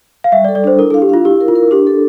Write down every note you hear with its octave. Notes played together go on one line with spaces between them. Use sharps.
F5
G3 E5
D5
A4
D5
D4 C5
E4 A#4
A4
F5
G4
F4 F5
E4 G4
A#4
F4
A#4
D4 G4
A4